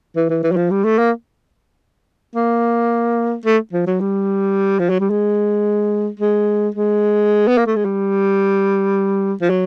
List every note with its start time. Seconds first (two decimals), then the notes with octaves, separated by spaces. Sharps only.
0.16 E3
0.29 E3
0.43 E3
0.52 F#3
0.56 F3
0.71 G3
0.84 A3
0.98 A#3
2.36 A#3
3.45 A3
3.73 F3
3.87 F#3
4.00 G3
4.79 F3
4.90 F#3
5.00 G3
5.10 G#3
6.20 G#3
6.75 G#3
7.47 B3
7.58 A#3
7.66 A3
7.76 G#3
7.85 G3
9.41 F3
9.50 F#3